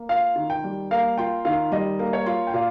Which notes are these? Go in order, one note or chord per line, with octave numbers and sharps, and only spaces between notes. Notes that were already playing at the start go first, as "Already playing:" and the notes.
Already playing: A#3
F4 F5
D#3
G5
G3
A#3 F5
F4 G5
D#3 F5
G3 D#5
A#3
C#5
F4
G5
A#2 F5